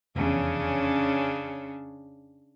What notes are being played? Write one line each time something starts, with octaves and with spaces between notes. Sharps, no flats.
F1 E2 C#3 C#4 D4